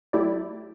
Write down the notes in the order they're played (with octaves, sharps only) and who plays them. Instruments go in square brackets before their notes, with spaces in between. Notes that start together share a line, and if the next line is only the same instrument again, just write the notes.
[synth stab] F#3 A3 E4 G4 D5